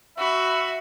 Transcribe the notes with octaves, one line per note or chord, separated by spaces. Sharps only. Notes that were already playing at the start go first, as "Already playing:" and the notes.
F#4 E5 B5